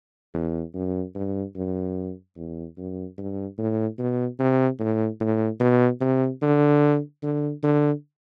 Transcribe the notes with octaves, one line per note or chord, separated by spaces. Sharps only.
E2
F#2
G2
F#2
E2
F#2
G2
A2
B2
C3
A2
A2
B2
C3
D3
D3
D3